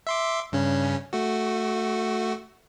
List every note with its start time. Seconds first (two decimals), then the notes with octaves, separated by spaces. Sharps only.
0.07 E5 C6 D6
0.52 G2 C#3 C#4
1.13 A3 F#4